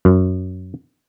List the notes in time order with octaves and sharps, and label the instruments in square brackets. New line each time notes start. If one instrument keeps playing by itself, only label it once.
[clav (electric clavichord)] F#2